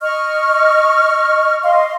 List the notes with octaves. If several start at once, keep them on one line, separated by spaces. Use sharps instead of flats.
D#5 C#6 F6
D#5 F5 C6